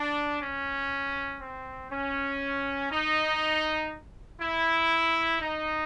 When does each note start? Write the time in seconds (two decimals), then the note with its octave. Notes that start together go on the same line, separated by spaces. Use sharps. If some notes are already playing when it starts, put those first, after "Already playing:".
Already playing: D4
0.41 C#4
1.40 C4
1.91 C#4
2.91 D#4
4.40 E4
5.40 D#4